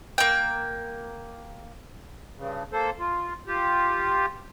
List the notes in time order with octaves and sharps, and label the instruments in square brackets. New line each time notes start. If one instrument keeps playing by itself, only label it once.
[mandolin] A#3 G5
[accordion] G2 C#3
A#3 A4 C5
F4
F4 G4